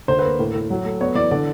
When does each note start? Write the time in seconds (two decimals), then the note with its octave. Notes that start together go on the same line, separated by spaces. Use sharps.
0.08 D2 C5
0.19 B4
0.24 A#3
0.39 A2
0.54 A2
0.70 F#3
0.85 A3
1.01 B3 C#5
1.15 E3 D5
1.31 D3 D5